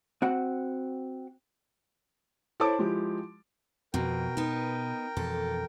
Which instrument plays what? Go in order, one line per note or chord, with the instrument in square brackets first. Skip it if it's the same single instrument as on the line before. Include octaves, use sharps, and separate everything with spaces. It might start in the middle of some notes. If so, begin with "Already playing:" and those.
[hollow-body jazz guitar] C4 F#4 F#5
[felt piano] E4 A4 C5 C#5 A5 D6
F3 G#3 E4 G4
[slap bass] F2 F3 [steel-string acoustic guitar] B2 [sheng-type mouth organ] A#4 G5
[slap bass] B2 [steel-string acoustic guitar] B3 D#4
[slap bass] F2 B2 E3 [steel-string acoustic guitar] A4